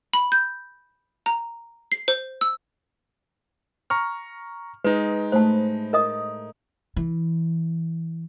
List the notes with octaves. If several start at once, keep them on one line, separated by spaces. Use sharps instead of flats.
B5
G6
A#5
C7
C5
E6
A#5 C#6 F6
G#3 D#4 B4
A2 A3 C5 A5 B5
A#4 D#5 D#6
E3